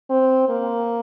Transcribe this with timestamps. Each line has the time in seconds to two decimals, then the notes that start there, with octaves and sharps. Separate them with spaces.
0.10 C4
0.49 A#3